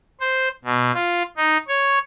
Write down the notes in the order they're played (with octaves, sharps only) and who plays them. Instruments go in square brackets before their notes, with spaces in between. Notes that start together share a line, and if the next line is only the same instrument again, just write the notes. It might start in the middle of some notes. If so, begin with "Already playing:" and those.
[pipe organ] C5
B2
F4
D#4
C#5